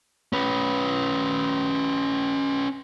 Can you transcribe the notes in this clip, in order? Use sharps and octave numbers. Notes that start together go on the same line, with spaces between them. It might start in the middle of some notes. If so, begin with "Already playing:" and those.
C#4 B4